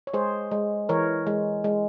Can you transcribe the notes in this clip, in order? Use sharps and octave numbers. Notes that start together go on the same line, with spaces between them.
C#5
G#3 G#4 C5
G#3
E3 A#4 C#5
G#3
G#3